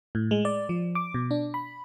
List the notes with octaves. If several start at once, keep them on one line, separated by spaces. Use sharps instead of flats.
A2
G#3
D5
F3
D6
B2
D4
B5